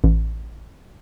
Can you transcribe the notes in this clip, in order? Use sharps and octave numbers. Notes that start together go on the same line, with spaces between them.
A1